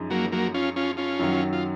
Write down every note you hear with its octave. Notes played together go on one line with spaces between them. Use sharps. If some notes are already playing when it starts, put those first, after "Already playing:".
Already playing: F#2 F3 G#3 D#4
F#3 A#3
F#3 A#3
C#4 F4
C#4 F4
C#4 F4
F#2 D#3 F#3
F4